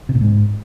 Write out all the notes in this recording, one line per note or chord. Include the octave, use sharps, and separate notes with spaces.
C3
A#2
G#2